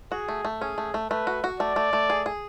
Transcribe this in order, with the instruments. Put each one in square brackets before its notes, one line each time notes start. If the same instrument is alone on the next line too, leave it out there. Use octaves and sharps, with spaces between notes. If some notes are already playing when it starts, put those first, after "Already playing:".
[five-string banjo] F#4 [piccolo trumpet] G#4
[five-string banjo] A3
A3
[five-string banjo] C#4 [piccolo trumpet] G#4
[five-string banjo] A3
A3
[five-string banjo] A3 [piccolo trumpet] B4
[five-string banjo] F#4
F#4
[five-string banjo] A3 [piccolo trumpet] D5
[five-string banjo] A3
A3
G#4
G#4